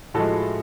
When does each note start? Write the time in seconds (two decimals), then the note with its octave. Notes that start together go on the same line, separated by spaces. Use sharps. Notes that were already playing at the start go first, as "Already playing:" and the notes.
0.14 A2 F3 G#3 F#4 A4